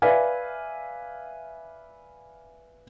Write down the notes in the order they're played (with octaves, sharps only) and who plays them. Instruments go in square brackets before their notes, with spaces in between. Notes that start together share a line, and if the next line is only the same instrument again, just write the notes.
[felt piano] B4 D5 E5 F5 G#5